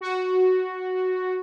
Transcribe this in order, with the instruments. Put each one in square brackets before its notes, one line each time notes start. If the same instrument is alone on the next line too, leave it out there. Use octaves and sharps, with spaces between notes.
[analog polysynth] F#4